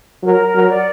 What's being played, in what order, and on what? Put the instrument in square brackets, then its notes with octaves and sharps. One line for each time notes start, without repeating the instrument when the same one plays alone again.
[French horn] F#3 [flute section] A#4
[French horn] F#3
[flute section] D5 F#5